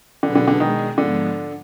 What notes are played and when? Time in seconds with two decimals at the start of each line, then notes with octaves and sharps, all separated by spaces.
0.22 B2 D3 F#3 D4 G#4 B4
0.35 D3
0.48 D3
0.60 B2 D#3 G#3 D4 G#4
0.98 G#2 D3 F3 G#3 B3 F4